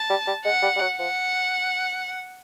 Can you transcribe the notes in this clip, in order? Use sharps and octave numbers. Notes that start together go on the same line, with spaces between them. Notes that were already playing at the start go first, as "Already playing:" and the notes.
Already playing: A5
G3
G3
G#3 F#5
G3
G3
F#3
F3 F#5